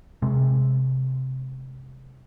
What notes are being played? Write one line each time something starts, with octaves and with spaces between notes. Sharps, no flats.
C3 G#3